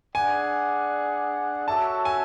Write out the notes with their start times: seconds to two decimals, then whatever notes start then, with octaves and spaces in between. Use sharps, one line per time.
0.14 D4 G#4 D5 F#5 G#5
1.68 F#4 A4 C#5 E5 A5
2.05 G#5